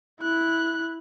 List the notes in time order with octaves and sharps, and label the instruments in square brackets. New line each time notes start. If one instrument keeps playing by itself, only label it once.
[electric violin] E4 F#6